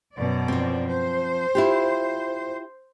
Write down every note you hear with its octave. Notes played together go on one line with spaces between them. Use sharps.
F#2 B2 D5
F3 C4
C5
E4 F4 G4